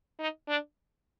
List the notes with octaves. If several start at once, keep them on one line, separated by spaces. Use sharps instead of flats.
D#4
D4